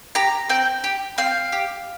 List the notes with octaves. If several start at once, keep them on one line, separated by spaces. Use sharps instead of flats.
G4 A#5
C4 G5
G4
C4 F5
G4